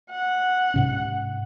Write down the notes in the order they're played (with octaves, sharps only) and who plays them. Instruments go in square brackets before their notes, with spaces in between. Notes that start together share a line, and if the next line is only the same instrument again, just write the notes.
[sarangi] F#5
[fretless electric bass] G#2 C3 C#4